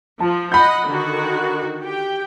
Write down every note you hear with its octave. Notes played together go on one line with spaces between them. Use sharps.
F3 A5
D#5 F#5 B5 G6
D3 D#3 F#4
G4 G5